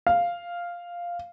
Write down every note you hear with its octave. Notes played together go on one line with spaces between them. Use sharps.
F5